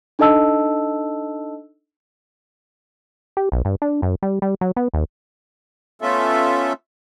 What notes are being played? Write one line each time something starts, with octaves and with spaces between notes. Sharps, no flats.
D4 D#4 A4 D#5 A5 E6
G4
B1
G2
D4
F#2
G3
G3
F#3
B3
D#2
A3 B3 C#4 F4 A4 E5